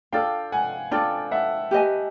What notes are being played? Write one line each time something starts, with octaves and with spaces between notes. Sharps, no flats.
D4 F4 A4 D5 F5 G5
F#5 G#5
D4 F4 A4 D5 G5 A5
E5 F#5
G4 B4 D#5 G#5